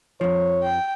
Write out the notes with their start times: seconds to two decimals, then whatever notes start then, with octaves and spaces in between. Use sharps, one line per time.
0.21 F2 F3 C#5
0.63 G5